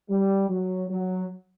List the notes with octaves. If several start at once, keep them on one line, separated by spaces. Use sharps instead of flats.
G3
F#3
F#3